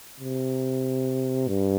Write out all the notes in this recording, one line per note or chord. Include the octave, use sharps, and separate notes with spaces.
C3
G2